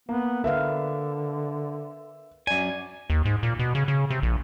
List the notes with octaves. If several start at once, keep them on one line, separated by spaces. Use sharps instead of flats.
A#3 B3
D3 A#4 B4 E5 F5
F#2 D5 G#5
D#2
G#2
A#2
B2
C#3
C#3
C3
A#1